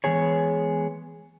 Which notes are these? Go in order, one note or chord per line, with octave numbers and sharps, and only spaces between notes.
E3 G#3 B3 G#4 C#5